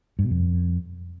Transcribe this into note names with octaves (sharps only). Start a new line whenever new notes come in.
G2
B2
F2